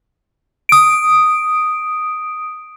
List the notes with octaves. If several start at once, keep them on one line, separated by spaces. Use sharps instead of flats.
D#6 D7